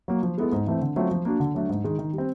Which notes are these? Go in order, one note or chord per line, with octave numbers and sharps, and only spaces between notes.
F#3 A#3
F3
G#3 B3 E4 A4
G#2
E3 A3 C4
D3
F#3 A3 C4 F4
F3
A#3 D4 F#4
D3
F#3 A3 D4
G#2
D#3 G#3
D#3
G3
C4